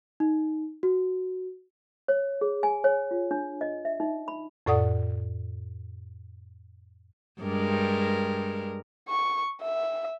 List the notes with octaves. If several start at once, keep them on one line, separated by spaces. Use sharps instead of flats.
D#4
F#4
C#5
G#4
G#5
C#5
F4
D4
D#5
E5
D#4
B5
F2 A2 A4 D5 F#5 D#6
G2 G#3 A#4
C#6
E5